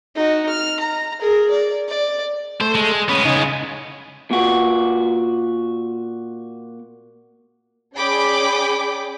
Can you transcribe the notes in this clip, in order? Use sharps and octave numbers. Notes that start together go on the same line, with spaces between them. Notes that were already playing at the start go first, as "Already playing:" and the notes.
D#4 F#4
F6
A#5
G#4 A#4
D5
D5
A3 C5
G#3
G#3 B3 C#4 B5 D#6
C#3 D#4 G#5
A#2 F#4
C#4 G#4 D5 G5 B5 D6